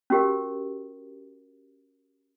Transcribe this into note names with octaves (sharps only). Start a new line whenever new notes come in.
C#4 F#4 G4 A#4